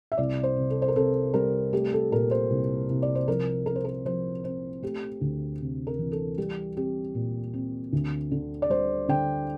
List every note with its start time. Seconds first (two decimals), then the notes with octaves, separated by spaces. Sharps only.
0.12 E5
0.17 C2 D5
0.43 C5
0.56 C3
0.70 A4
0.82 C5
0.88 A#4
0.95 C3 A4
1.34 G3 A#4
1.73 A3 G4
1.93 A4
2.12 A#2 A#4
2.31 C5
2.50 C2
2.89 C2
3.02 D5
3.15 C5
3.28 F3 A#4
3.66 C4 A#4
3.76 C5
3.85 A#4
4.05 F3 C5
4.44 C4 C5
4.82 A3 G4
5.21 D2
5.61 C3
5.87 A#4
5.99 E3
6.12 A4
6.38 G3 G4
6.77 C4 G4
7.15 A#2
7.53 C4
7.93 D2
8.31 D3
8.62 D5
8.70 G3 C5
9.08 D3 G5